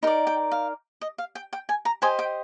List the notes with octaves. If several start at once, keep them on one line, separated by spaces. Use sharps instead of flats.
D#4 A#4 D5
G5
F5
D#5
F5
G5
G5
G#5
A#5
G4 C5 D#5 G#5
G5